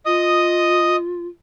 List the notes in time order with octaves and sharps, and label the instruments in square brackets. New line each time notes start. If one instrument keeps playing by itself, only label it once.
[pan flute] F4 [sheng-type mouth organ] D#5 D#6